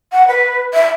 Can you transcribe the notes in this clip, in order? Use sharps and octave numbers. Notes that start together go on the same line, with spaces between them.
F#5
B4
E5